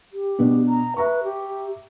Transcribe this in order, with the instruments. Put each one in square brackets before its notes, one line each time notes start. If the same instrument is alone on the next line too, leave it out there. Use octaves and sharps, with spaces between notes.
[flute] G4
[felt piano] B2 B3 D4
[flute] A#5
[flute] B4 [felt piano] E5 A#5 C#6
[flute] G4